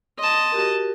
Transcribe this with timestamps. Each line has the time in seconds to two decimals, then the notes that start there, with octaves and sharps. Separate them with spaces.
0.19 D#5 A5 C6
0.52 F#4 G4 A#4